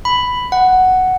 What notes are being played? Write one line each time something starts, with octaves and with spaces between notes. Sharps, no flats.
B5
F#5